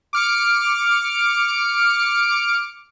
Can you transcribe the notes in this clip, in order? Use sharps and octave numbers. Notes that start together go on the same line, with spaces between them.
D6 F6 C#7 D7